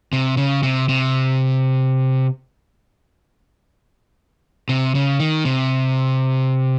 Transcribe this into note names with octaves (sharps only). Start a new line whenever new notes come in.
C3
C#3
C3
C3
C3
C#3
D#3
C3